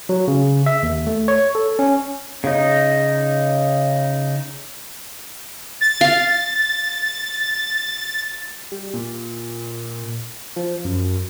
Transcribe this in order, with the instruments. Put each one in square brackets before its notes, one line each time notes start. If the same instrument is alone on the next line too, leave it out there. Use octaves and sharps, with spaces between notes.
[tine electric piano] F#3
C#3
E5
D#2
A3
C#5
A4
C#4
[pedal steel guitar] C#3 D#4
[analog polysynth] A6
[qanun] F5
[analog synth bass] G3
A#2
F3
F#2